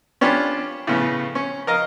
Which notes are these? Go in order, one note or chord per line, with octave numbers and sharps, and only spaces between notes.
C#4 D4 F4 G4 B5
A2 C#3 B3
C#4
A#4 D#5 F5